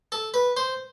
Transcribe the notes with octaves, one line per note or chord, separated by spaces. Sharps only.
A4
B4
C5